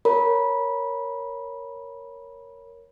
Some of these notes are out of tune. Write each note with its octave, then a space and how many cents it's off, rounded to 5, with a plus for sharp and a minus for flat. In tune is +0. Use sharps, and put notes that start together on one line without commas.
A#4 +0 C#5 +0 B5 -15